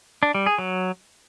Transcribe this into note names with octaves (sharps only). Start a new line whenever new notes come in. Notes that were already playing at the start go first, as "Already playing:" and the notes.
D4
G3
G#4
F#3